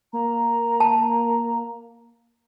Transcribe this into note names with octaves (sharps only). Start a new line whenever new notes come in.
A#3 A#5
A5